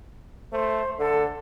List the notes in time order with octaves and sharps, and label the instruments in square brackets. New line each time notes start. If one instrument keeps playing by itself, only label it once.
[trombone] A3 [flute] C5
[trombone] D3 [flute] A4